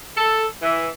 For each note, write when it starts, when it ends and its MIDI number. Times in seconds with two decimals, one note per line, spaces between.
0.15 0.45 69
0.62 0.87 52